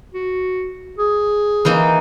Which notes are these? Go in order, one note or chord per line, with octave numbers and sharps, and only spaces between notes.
F#4
G#4
E3 A#3 D#4